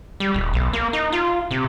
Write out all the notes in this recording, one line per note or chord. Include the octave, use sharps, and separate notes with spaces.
G3
D#1
B1
A#3
D#4
F4
C3